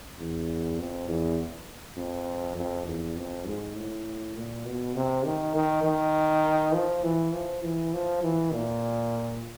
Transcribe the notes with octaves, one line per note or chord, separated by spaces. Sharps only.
E2
F2
E2
F2
F2
E2
F2
G#2
A2
A#2
B2
C3
D#3
D#3
D#3
F3
E3
F3
E3
F3
E3
A#2